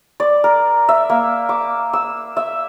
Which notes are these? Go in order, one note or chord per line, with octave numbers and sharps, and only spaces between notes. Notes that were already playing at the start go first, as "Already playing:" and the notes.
D5
A#4
E5
A#3
D6
E6
E5